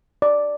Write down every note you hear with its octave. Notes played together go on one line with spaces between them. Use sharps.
D5